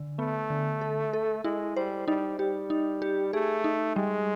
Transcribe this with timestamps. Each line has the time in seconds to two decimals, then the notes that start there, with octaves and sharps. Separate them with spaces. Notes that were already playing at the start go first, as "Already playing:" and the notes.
Already playing: D3
0.19 A3 B3
0.50 D3
0.81 A4
1.13 A4
1.44 G#3 E4
1.76 G3 C5
2.07 G3 D#4
2.39 G3 G4
2.70 D#4
3.02 G4
3.33 A3 G#4
3.64 D#4
3.96 G3 G#3